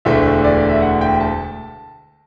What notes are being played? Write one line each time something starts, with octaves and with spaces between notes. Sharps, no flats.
E1 D2 D3 A3 E5
D5
D5
E5
F#5
G5
A5